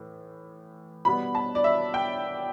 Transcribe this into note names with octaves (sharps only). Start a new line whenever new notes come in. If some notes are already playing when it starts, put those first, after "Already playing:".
Already playing: A2 E3
B2 G3 B3 B5
A5
D5
E5
G5